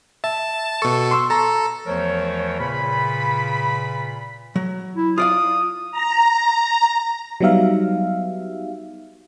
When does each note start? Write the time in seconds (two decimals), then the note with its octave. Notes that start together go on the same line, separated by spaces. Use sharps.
0.24 E5 A5
0.82 B2 A4 C#6
1.11 C6 C#6 E6
1.31 A4 A#5
1.86 E2 E3 F3 A3 A#4 C#5
2.59 A#2 C#3 F4 B4 B5
4.56 F#3
4.97 E4
5.18 F4 D5 F5 D#6
5.92 A#5
7.41 F#3 G3 B3 D#4 E5 F5